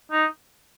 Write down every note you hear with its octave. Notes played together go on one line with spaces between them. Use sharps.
D#4